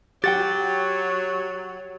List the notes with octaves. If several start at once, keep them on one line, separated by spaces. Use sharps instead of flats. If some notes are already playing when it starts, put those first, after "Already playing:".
F#3 G4 C#5 F#5 G5 A6